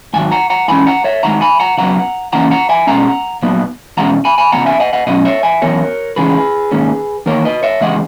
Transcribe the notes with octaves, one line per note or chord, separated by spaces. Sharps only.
G#2 D#3 F#3 G#5
F#5 A#5
F#5 A#5
G#2 E3 G#3 C#4 G#5 B5
F#5 A#5
C#5 E5
F#2 D#3 G#3 F#5 A#5
G#5 B5
F#5 A#5
C#3 F#3 B3 F#5 A#5
C#3 E3 A#3 C#4 F#5 A#5
F#5 A#5
E5 G#5
B2 G#3 C#4 F#5 A#5
A#2 F#3 B3
E2 B2 G#3 C#4 F#5 A#5
G#5 B5
G#5 B5
C#3 G#3 B3 F#5 A#5
E5 G#5
D#5 F#5
D#5 F#5
B2 F#3 C#4 D#5 F#5
C#5 E5
E5 G#5
F#2 E3 B3 A#4 C#5
C#3 E3 G#3 C#4 G#4 B4
G#2 D#3 A#3 C#4
E2 D#3 A#3 A#4 C#5
B4 D#5
C#5 E5
E2 C#3 G#3 D#5 F#5